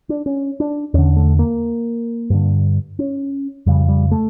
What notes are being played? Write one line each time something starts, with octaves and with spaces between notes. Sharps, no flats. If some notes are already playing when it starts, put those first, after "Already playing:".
D4
C#4
D4
E2 D3 C#4
A3
A#3
G2 D3
C#4
F2 C#3 G3
G3
A3